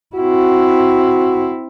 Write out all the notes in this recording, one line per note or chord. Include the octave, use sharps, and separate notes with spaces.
C4 E4 F#4